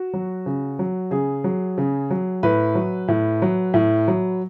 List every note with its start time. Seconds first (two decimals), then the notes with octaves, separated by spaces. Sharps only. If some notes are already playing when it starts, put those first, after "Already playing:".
Already playing: F#4
0.13 F#3
0.46 C#3
0.79 F#3
1.11 C#3 G#4
1.44 F#3
1.78 C#3
2.10 F#3
2.43 A2 B4
2.75 F#3
3.08 A2
3.42 F#3
3.74 A2
4.08 F#3